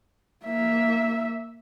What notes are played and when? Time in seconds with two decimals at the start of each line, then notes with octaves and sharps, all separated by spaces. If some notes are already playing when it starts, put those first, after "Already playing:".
0.45 A#3 E5